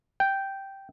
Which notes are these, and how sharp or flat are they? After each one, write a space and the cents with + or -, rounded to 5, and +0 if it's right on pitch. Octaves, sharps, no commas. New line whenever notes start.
G5 -5